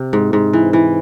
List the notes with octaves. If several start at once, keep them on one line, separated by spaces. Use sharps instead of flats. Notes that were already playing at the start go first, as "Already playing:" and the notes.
Already playing: C3
G#2
G#2
E3
E3